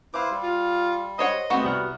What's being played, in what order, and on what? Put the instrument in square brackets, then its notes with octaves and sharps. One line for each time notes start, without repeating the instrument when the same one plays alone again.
[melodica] E4 B4 C5 [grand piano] F5 D6
[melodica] G3
[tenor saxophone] F4
[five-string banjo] C5 C#5 F#5 [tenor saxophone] D#5
[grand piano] A3 C4 C#6 [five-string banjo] B3 F#4
[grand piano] C2 F#5 F6 [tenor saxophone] G3